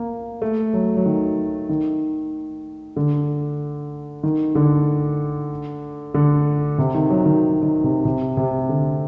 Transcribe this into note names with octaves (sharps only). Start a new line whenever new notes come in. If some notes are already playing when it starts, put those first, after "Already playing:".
Already playing: A#3
A3
F#3
F#3
D#3
D#3
D3
D#3
D3
D3
C3
D#3
F#3
D#3
D#3
C3
C3
C3
D3